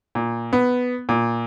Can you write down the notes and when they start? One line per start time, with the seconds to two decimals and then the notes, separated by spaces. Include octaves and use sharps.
0.15 A#2
0.53 B3
1.09 A#2